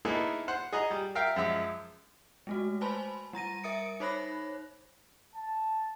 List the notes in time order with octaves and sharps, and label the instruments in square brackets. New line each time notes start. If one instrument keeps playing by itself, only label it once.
[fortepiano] A#3 B3 D#4 E4 G#4 A4
C5 F#5
G#4 D#5 F#5 A#5
G3
A#4 E5 F5 G5
F#2 F3 G#3 E5
[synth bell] G#3 A3 F#4
B4 C5 G#5 A5 B5 C6
G3 A#5 A#6 D#7
A#4 E5 D#6 C#7 D7
D#4 C5 C#5 B5 F#6 A#6
[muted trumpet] A5